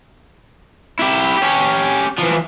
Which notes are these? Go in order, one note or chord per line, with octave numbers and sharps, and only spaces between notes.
E4 G4
C#4 G4
E3 F3